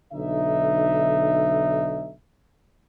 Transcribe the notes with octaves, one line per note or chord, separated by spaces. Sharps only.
B1 D3 D#4 E5